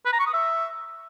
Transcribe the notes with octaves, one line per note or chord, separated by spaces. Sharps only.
B4
A#5
C#6
D#6
E5